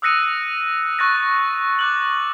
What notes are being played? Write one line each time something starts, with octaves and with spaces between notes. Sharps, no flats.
D#6 E6 F#6 A#6 C#7 D#7
C#6 F#6 A6 A#6
D6 F#6 F#7